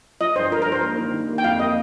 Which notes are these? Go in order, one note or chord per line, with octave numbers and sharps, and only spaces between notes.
F3 D#5
G2 C5
F3 A#4
A#4
G2
C5
A#3
D#3
D#3
A#3
G5
F2 F5
A#3 D#5